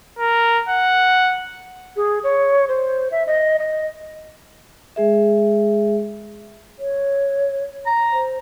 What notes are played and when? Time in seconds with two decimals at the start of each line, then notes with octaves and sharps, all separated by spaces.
0.19 A#4
0.69 F#5
1.96 G#4
2.24 C#5
2.68 C5
3.11 E5
3.27 D#5
3.59 D#5
4.96 G#3 G#4 E5
6.79 C#5
7.86 A#5
8.13 C5